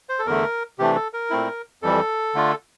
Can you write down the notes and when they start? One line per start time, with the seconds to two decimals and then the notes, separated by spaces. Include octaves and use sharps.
0.09 C5
0.19 A4
0.26 E2 D3 A3 A#4
0.79 C3 E3 A3 D4 G4
0.96 A4
1.13 A#4
1.30 A#2 A3 C4 E4
1.82 F2 E3 G3 A4
2.34 D3 A3 D4 F4